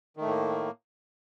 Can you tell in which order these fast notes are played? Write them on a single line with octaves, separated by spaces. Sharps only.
D#3 A3 A2 A#3